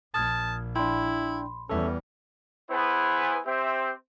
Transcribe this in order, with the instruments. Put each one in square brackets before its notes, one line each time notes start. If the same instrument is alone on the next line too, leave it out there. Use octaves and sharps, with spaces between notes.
[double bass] A#1 [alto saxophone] A5 [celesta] D#6 F6 G#6
[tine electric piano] D4 G5 [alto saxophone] E4 [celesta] B5 C6
[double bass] E2 G3 [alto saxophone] C#4 [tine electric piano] A4 E5
[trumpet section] B3 E4 G#4 B4 C5 G#5
C4 G4 C5 E5